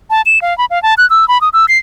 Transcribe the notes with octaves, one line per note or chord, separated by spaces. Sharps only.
A5
E7
F5
B5
F5
A5
F#6
E6
B5
D#6
E6
C7